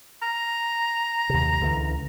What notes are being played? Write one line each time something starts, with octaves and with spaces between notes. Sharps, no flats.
A#5
D#2 C3
C#2 D3 E3